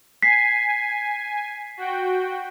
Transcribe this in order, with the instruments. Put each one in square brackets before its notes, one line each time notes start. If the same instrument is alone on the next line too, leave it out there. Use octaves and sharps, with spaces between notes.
[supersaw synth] G#5 [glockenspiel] B6 C7
[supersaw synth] F#4 G5